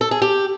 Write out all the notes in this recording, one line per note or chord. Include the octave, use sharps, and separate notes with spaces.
A4
G#4
G4